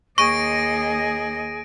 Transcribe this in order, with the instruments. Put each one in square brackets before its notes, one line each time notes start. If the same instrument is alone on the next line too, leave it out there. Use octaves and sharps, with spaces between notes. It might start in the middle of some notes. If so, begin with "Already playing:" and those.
[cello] D#2 D#5 [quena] G#4 [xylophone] C#6 [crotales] A#6 D7 D#7